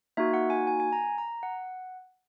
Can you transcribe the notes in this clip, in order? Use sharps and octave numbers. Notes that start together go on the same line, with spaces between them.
A#3 D#4 F#4 E5
F#5
G#5
G#5
G#5
A#5
A#5
F#5